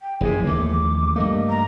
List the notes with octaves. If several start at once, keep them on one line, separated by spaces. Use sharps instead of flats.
G5
F#1 F#2 C3 E3 F3 G#4
D#2 C#3 A3 D6
G2 A3 A#3 D#5
A#5